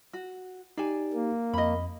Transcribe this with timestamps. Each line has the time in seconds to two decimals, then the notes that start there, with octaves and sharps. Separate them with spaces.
0.13 F#4
0.78 D#4 G4 D5 G#5
1.14 A#3
1.54 F2 D#5 B5